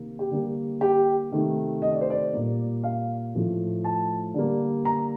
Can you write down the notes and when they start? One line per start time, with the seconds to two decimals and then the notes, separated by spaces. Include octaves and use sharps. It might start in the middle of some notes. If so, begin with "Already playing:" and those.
Already playing: C3 D#3 A#3
0.19 G4
0.31 D3 G3 A#3
0.81 G4
1.32 C3 D#3 A3
1.82 D#5
1.92 D5
2.01 C5
2.10 D5
2.33 A#2 G3 A#3
2.84 F5
3.34 A2 F3 A3
3.84 A5
4.34 D3 G3 A#3
4.85 A#5